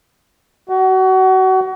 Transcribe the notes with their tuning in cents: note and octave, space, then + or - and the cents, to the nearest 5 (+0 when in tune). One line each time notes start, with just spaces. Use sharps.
F#4 +30